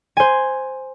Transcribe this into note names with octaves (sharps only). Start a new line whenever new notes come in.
C5 G#5